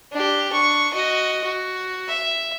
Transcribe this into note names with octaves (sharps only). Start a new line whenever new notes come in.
D4 G4
D4 C#6
F#4 D#5
F#4
E5